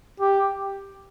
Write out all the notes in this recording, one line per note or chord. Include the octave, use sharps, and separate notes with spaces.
G4